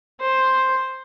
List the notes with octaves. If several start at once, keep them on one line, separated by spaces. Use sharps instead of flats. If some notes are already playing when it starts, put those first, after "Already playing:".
C5